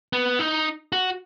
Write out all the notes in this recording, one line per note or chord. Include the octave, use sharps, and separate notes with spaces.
B3
D#4
F#4